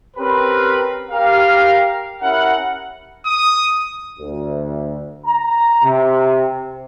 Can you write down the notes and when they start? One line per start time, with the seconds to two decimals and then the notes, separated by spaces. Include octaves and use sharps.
0.17 C4 C#4 G4 A#4 B4
1.11 G4 A#4 F5
2.21 C#4 E4 G4 A#4 F#5
3.26 D#6
4.19 D2
5.26 A#5
5.83 C3